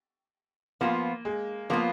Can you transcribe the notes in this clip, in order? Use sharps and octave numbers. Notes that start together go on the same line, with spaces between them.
F3 A#3 B3 F4
G#3
F3 A#3 B3 F4